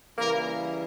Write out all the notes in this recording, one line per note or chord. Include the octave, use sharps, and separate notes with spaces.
C#3 E3 G3 A#3 A#4